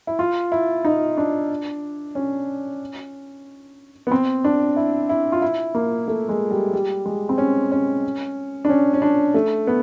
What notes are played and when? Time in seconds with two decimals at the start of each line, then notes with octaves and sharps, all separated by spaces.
0.07 E4
0.19 F4
0.52 E4
0.85 D#4
1.17 D4
2.15 C#4
4.07 B3
4.11 C4
4.44 D4
4.76 E4
5.09 E4
5.32 F4
5.42 E4
5.75 A#3
6.08 A3
6.29 G#3
6.51 G3
6.73 G3
7.06 G#3
7.29 C4
7.38 C#4
7.72 C#4
8.65 D4
8.69 C#4
8.93 C#4
9.02 D4
9.34 A3
9.67 B3